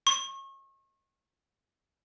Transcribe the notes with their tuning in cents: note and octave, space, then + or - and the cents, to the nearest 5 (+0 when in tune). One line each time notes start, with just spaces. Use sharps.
C#6 -35